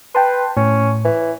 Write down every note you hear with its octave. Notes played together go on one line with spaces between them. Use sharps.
B4 G5 A5 C6
A2 C#4
E3